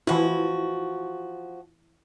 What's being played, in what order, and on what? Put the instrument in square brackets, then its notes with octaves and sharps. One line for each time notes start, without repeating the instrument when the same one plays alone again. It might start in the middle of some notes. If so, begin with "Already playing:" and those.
[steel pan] E3 E4 [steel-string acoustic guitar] F3 F#4